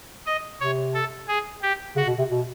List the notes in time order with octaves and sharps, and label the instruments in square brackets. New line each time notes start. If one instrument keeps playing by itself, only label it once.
[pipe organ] D#5
[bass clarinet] C3 [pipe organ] C#5
[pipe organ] A4
G#4
G4
[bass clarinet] C#3 [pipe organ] F#4
[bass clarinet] B2
C3
B2